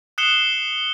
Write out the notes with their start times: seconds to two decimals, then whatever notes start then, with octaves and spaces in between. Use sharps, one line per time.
0.18 D#6 F#6 C7 C#7 E7 G7